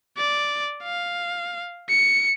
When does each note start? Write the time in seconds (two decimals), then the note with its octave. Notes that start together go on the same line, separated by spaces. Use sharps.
0.17 D5
0.83 F5
1.89 C#7